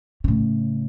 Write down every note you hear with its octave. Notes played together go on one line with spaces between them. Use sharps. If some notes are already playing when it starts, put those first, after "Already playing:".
A2 C#3